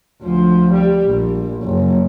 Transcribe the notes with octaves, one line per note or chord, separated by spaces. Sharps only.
D2 F3
G3
A#1
F#1